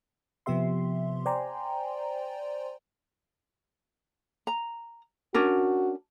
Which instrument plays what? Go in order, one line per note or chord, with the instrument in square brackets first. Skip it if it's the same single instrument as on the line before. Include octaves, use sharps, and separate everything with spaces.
[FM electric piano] C3 F3 B3 G4 E5 C6
C5 D5 G5 G#5 A#5 C6
[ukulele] A#5
[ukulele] C#4 D4 A#4 [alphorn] F#4